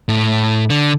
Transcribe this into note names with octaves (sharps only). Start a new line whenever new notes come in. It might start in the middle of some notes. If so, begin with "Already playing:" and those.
A2
D3